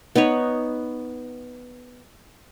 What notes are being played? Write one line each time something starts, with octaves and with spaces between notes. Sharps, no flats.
B3 D#4 B4 C#5